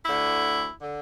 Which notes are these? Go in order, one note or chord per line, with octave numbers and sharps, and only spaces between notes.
D2 D3 E4
D3